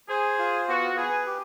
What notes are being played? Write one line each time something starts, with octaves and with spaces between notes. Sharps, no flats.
G#4 C5
F4
B3 F#4
G#4 B4
G4